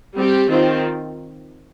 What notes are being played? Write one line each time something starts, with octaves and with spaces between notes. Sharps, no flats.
G3 C4 G4
D#3 C4 F4